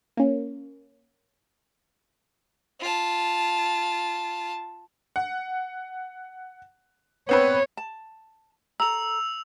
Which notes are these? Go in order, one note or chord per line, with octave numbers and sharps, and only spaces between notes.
A#3 C#4
F4 A5
F#5
B3 C4 B4 C#5
A5
A4 A#5 E6 F7